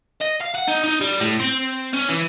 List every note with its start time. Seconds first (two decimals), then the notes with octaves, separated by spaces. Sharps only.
0.21 D#5
0.40 F5
0.54 F#5
0.68 D#4
0.84 D#4
1.01 G3
1.20 A2
1.40 C4
1.93 C#4
2.09 E3